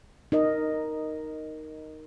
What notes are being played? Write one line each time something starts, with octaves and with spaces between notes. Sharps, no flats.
D#4 A#4 D#5